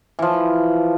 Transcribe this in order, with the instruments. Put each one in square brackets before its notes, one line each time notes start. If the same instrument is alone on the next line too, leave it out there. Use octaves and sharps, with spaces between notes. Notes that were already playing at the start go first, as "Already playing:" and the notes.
[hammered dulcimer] E3 F3